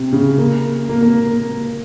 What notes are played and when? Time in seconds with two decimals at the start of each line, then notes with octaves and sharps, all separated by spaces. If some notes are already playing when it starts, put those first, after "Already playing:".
Already playing: C3
0.13 C#3
0.38 A#3
0.89 A#3
1.02 A#3